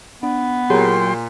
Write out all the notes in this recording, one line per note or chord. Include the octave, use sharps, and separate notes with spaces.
B3 D4
A#2 F#3 G4 G#4 C#5 G5 C6